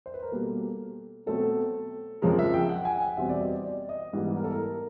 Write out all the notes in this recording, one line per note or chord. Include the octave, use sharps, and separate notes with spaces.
C5
B4
A#4
B2 G3 A#3 A4
B2 F#3 A3 C4 A4
F2 C#3 F3 G#3 A#4
E5
G5
F#5
G#5
F#5
E2 B2 G3 C4 E5
D5
D#5
D5
D#5
G#2 E3 G3 B3
A#4
A4
A#4